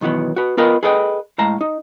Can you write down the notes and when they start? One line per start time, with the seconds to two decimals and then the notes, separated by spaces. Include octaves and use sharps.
0.01 B1 D#3 E3 F#3 B3
0.36 F#4 B4
0.57 B3 F4 A#4 B4 D#5 G5
0.83 G#4 A4 B4 D#5 F#5 G5
1.38 A2 G#3 F5 A5 A#5
1.61 D#4